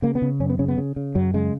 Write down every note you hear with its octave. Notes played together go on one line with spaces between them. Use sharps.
C#3 A#3
B3
C#3
F#2 C#4
B3
C#3 C#4
B3
C#3
C#3
F#2 F#3
C#3 G#3